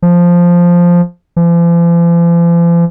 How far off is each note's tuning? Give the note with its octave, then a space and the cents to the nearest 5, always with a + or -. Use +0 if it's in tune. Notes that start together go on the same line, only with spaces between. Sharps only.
F3 +0
F3 -45